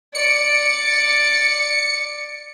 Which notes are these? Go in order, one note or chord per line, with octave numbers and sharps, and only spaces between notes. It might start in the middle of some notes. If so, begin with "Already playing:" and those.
D5 C#7